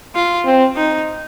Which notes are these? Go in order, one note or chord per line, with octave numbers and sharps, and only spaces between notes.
F4
C4
D#4